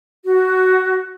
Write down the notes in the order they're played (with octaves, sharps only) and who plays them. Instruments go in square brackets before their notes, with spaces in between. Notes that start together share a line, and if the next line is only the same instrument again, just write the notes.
[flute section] F#4